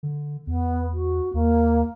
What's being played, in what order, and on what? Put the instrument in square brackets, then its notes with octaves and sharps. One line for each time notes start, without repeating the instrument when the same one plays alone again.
[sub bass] D3
[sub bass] E2 [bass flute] B3
[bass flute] F#4
[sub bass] D#2 [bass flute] A#3